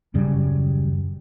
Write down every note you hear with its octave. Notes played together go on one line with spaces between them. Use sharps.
D#1 F#2 C#3 G3